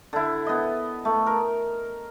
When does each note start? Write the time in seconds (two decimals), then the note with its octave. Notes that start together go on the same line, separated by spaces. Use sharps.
0.13 D3 E4
0.47 B3 D#5
1.05 A3
1.26 A#4